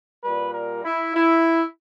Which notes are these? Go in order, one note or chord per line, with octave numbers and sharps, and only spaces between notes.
A#2 G3 B4
A#4
E4
E4